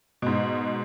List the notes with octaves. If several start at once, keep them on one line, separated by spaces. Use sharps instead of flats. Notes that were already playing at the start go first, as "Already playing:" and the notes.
G#2 B2